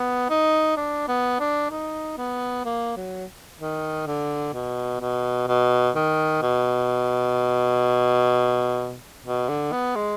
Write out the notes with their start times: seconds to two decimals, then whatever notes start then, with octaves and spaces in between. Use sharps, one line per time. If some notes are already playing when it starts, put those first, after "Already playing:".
Already playing: B3
0.30 D#4
0.77 D4
1.08 B3
1.40 D4
1.71 D#4
2.18 B3
2.65 A#3
2.97 F#3
3.60 D#3
4.07 D3
4.54 B2
5.01 B2
5.48 B2
5.95 D#3
6.42 B2
9.25 B2
9.49 D3
9.72 B3
9.96 G#3